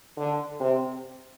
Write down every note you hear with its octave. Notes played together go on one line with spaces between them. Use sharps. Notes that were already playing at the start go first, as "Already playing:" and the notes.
D3
C3